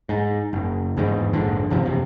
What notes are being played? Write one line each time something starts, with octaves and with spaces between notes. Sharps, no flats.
G#2
F#1
G1 E2 G#2 D#3
A#1 F2 G#2 D3
G1 E2 C3 F3
F#1 C3